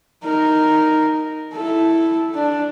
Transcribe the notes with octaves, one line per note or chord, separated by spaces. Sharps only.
D#4 A#4
E4 A4
D4